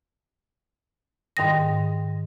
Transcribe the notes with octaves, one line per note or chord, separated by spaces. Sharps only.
G#2 D#3 G5 D#6 A#6